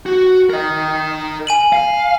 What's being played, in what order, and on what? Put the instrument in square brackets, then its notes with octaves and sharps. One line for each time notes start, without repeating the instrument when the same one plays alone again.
[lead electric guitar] F#4
A#4 D#5
[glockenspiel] G#5 D#7 F#7
[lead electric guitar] F5